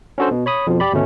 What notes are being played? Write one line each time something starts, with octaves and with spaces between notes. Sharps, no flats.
C#4 D4 F#4 A4 C5
B2
C#5 B5 D#6
F2 B2 F3
G4 D5 B5
G#1 D2 B2 A3 C#4